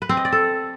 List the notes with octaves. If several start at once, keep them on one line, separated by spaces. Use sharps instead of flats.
B4
C4
D#5
D5
A4